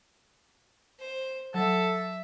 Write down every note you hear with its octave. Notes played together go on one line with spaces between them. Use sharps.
C5
F#3 A4 E5